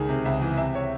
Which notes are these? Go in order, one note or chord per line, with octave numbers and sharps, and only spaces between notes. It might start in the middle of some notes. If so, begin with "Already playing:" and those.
Already playing: C#2 D#3 G#4
C3
C#2 E5
E3
C3 E5
C#5